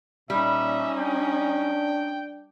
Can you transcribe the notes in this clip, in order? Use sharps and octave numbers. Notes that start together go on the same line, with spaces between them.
A#2 G3 C#4 D#4 E5
D4 G5